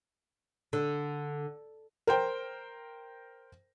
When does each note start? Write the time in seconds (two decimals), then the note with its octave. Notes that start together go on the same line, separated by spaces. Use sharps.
0.73 D3
2.07 A#4 C5 G5